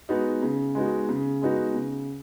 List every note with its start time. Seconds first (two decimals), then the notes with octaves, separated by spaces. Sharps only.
0.09 G#3 B3 D#4 F#4
0.42 C#3
0.75 G#3 B3 D#4 F#4
1.09 C#3
1.42 G#3 B3 D#4 F#4
1.74 C#3